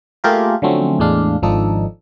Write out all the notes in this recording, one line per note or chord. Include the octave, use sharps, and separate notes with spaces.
A3 A#3 F4 G4 G#4 A#4
D3 F3 F#3 A3 C4 C#4
E2 A2 G#3 D4 F5
G#1 F3 D4 D#4 A4